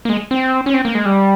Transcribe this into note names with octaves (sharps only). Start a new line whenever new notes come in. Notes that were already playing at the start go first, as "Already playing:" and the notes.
A#3
G#3
C4
C#4
C4
A#3
G#3
G3